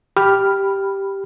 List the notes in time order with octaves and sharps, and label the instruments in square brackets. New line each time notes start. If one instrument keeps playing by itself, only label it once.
[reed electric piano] G4 B5 F6